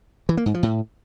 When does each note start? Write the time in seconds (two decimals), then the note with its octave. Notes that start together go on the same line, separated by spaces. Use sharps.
0.29 E3
0.37 A#3
0.46 G#2
0.54 F3
0.63 A2